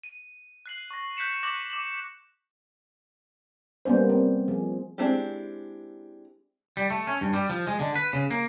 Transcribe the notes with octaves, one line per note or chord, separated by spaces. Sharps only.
D#7
F#6 C7 F#7
C#6 A#6
F#6 G6 B6 C#7 E7
C#6 D6 F#6 A#6 C#7 F#7
D6 E7 F#7
G3 A#3 B3 C#4 C5
C4
F3 G#4
G#3 C4 D4 E4 G4
G3
A3
C#4
G2
G3
F3
G#3
D3
B4
C#3
A#3